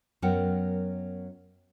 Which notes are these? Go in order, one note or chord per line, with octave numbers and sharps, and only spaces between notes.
F#2 F#3 B3 A#4 F#5 G5